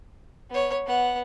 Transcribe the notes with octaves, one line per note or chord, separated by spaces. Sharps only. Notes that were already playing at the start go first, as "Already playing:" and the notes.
B3 C#5
B3 F#5